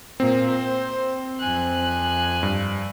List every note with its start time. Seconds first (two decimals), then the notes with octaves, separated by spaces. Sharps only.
0.20 A#2 A#3 C4
0.49 C5
1.39 F2 G#5 F#6
2.43 G2